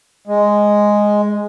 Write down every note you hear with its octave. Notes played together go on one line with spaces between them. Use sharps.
G#3